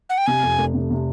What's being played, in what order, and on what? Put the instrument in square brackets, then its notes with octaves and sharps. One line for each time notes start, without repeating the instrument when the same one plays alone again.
[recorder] F#5
G5
[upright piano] C3 [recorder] G#5
[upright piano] F2
F1
C3
C3